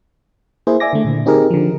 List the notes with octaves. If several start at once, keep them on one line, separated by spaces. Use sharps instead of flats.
A#3 E4 G#4 C5
D5 E5 G#5 D6 A#6
D3 A3
A#2 D3
C4 D#4 G4 G#4 A#4
D3 F3